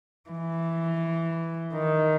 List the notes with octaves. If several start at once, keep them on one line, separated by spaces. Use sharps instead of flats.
E3
D#3